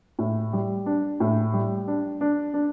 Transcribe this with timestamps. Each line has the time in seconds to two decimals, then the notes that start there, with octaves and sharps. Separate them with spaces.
0.19 A2
0.53 G3
0.86 D4
1.20 A2
1.53 G3
1.88 D4
2.21 D4
2.54 D4